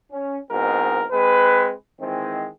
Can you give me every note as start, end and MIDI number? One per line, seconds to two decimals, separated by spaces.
0.12 0.37 61
0.51 1.04 44
0.51 1.04 47
0.51 1.04 52
0.51 1.04 60
0.51 1.04 70
1.11 1.72 56
1.11 1.72 60
1.11 1.72 71
2.01 2.47 51
2.01 2.47 52
2.01 2.47 56
2.01 2.47 60